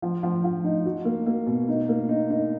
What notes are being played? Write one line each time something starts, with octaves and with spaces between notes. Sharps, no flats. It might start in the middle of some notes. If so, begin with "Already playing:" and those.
F3
F3
F3
D#4
F#4
A#3
A#3
B2
D#4
A#3
D#4
D#4